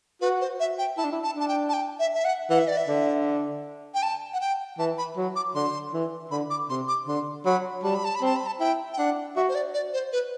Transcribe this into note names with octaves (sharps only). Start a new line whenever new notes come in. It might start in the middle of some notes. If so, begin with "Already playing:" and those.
F#4 B4
C5
E5
G5
E4 A5
D4
E4
A5
D4 A5
G5
A5
G5
E5
E5
F#5
E3 F#5
E5
D5
E5
D3
G5
A5
F#5
G5
E3 A5
B5
F#3
D6
D3 C6
E3
D3 B5
D6
C3 C6
D6
D3 C6
F#3 B5
G3 A5
B5
A5
B5
C4 A5
B5
A5
E4 G5
G5
D4 F#5
F#4 E5
C5
D5
D5
C5
B4